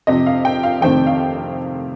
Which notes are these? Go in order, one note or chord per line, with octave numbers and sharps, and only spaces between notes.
F2 C3 F3 D#5
F5
G5
F5
F2 C3 D#3 A3 C4 G5
F5